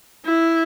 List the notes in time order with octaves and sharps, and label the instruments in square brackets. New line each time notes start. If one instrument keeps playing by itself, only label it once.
[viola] E4